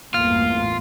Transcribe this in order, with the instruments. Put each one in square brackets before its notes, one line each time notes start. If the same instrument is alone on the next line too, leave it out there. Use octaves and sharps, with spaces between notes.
[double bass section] A1 E2 G2 [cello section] A#3 [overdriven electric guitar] F4 [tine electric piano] F6